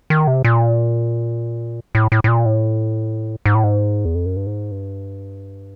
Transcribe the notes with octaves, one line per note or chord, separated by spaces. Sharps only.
D#3
C3
A#2
A2
A2
A2
A#2
A2
G#2
A2
G#2
E2
F2
F#2
G2
G#2
G2